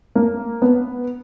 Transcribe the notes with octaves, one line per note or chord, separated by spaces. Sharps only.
A#3
B3